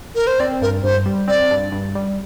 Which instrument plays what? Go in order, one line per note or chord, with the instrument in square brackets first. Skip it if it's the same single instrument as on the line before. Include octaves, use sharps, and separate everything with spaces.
[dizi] A#4
C5
[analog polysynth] C4 [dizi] D5
[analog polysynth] G2 [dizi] A#4
[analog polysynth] G2 [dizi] C5
[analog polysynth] G3
[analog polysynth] C4 [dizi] D5
[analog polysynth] G2
G2
G3